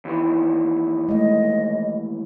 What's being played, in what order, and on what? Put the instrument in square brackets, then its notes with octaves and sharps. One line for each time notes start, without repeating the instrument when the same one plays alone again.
[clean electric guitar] D#2 E3
[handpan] G#3 A3 [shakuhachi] D#5